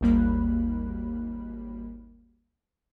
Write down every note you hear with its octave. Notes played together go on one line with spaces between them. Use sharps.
G#1 D#2 G3 A#3 B5 F#6